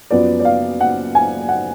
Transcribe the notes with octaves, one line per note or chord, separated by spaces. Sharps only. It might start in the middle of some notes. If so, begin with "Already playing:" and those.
F#2 F3 B3 D5
D5
F5
F#5
G#5
F#5